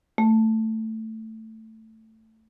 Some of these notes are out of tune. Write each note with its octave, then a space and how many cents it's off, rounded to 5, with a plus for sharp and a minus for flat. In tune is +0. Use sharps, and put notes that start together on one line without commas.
A3 +10